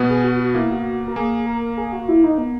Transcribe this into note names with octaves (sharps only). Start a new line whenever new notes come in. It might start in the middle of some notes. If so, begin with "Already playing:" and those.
Already playing: B2 B3
G#4
F#4
F#4
A#3 E4
F#4
A#4
A#3 G#4
A#4
G#4
F#4
E4
D#4
B3